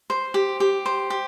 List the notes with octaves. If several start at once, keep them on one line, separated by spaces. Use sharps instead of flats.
C5
G4
G4
C5
G4